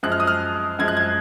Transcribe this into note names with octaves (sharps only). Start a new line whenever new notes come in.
F#2 F3 G#3 F#6
F6
D#6
F6
F#2 F3 G#3 G#6
F#6
G#6